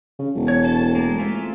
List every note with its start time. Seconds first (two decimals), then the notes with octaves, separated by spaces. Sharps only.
0.19 C#3
0.35 E1
0.48 C#5
0.64 A4 A5
0.95 G#3 A#3
1.19 A3 C4 F4